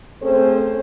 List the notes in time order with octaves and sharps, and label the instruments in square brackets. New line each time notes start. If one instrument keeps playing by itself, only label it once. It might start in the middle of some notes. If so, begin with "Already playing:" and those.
[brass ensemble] A3 C4 C#4 G#4 A4 C5